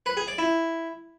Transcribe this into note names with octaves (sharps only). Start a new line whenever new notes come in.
B4
G#4
D5
E4